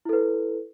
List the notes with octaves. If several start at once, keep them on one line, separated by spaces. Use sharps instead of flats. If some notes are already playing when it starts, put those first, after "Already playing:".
E4 A4 B4